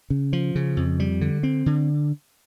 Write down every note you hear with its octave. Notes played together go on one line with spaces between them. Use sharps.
C#3
F3
C#3
F2
G3
D3
C4
D3